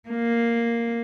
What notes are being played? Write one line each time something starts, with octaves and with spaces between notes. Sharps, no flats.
A#3